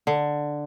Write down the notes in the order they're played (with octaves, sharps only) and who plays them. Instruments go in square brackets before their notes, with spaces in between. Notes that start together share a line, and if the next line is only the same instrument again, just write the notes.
[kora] D3